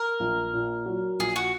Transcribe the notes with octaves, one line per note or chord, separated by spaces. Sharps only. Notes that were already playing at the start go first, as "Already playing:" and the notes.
Already playing: A#4
A#1
A#2
F#3
A#1 G#4
F#4